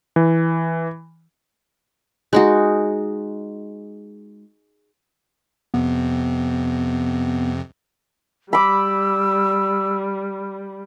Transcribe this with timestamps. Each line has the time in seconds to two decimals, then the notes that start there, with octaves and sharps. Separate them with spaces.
0.16 E3
2.33 G#3 D#4 F#4
5.74 F2 C3 B3
8.53 G3 B5 D6 E6